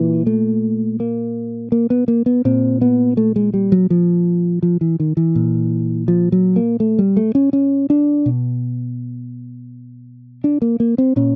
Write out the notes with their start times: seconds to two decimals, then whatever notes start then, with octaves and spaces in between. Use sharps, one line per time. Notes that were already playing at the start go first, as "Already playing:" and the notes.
Already playing: A#2 E3
0.27 A3
1.00 A#3
1.72 A#3
1.90 B3
2.08 A#3
2.26 B3
2.45 A#2 C4
2.81 B3
3.17 A3
3.36 G#3
3.54 G3
3.72 F#3
3.90 F3
4.63 F3
4.81 E3
5.00 D#3
5.17 E3
5.35 A#2
6.08 F3
6.32 F#3
6.56 A#3
6.80 A3
6.99 G3
7.17 A3
7.35 C#4
7.53 C#4
7.90 D4
8.26 B2
10.44 D4
10.62 A#3
10.80 A#3
10.98 C4
11.16 A#2 C#4